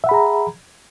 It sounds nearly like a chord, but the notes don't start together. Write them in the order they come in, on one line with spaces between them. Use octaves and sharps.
E5 F#5 B5 G#4 A#5